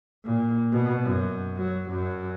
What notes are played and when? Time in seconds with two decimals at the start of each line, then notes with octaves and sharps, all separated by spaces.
0.24 A#2
0.72 B2
1.04 F#2
1.57 F#3
1.90 F#2